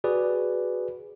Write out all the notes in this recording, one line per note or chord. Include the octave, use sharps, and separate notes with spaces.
F#4 G#4 B4 D5